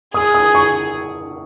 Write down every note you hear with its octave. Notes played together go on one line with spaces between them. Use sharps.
G#4 D#6
D#6
C#6